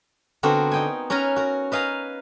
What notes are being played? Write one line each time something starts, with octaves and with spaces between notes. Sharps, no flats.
D3 B3 C4 D4 F#4 A#4
D#4 G5 G#5
C#4 A#4 B4 G#5 A#5
F#4 A#4
B4 D#5 F5 G#5 A#5